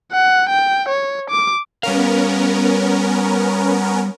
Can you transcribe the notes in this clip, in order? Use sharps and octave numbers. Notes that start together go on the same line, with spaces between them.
F#5
G5
C#5
D6
G3 B3 C#4 A#4 F5